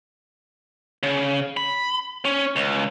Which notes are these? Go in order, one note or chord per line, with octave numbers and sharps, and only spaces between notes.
C#3
B5
C#4
C#2